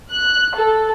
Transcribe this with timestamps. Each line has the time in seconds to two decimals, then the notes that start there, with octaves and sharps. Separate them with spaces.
0.12 F#6
0.56 A4